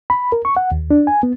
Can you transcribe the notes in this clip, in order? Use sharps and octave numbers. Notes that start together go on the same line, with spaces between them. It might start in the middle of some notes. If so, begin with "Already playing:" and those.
B5
A#4
C#6
F#5
D#2
D4
G#5
B3